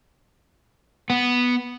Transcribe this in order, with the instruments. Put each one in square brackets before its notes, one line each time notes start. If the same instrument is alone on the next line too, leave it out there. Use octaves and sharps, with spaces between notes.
[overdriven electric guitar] B3